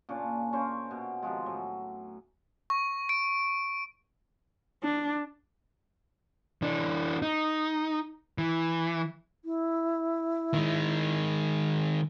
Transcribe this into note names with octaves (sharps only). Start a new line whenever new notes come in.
A#2 C#3 D4 C#5
C#4 A#4 C5 C#5
B2
C3 D#3 F3 G#3
A2 F#3
C#6
D7
D4
E3 D4
D#4
E3
E4
D#3 G#3